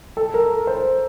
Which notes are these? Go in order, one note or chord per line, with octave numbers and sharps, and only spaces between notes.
A4
A#4
C5